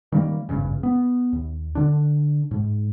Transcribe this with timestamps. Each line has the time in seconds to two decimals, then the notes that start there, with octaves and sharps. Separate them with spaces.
0.12 D#3 G3 A3 A#3
0.49 G#1 E2 G2 C#3
0.83 B3
1.33 D#2
1.75 D3 D4
2.51 G#2